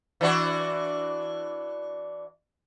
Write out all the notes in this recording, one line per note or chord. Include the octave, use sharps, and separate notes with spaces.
E3 D4 F#4